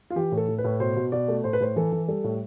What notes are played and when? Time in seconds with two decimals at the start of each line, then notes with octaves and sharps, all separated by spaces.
0.10 F4
0.16 E3 G4
0.32 A2
0.37 A4
0.48 A2
0.58 B4
0.64 A2
0.80 B2 C5
0.96 B2
1.12 B2 D5
1.28 A3
1.44 A2 C5
1.53 B4
1.60 A2 C5
1.76 E3 A4
1.92 E3
2.08 G3 A4
2.24 A2